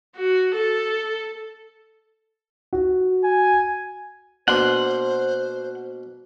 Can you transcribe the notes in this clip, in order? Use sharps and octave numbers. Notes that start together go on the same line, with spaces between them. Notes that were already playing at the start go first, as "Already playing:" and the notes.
F#4
A4
F#4
G#5
B2 A#3 D4 C5 F#5 C6